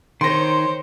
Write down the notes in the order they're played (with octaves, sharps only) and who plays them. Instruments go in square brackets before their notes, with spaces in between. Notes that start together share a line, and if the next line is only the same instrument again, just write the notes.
[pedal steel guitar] D#3 [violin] C5 C#5 [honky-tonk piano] C6 A#6